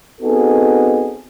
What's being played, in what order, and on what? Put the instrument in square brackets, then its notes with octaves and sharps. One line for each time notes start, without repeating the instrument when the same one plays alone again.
[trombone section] B3 C4 D#4 F#4 G#4 A4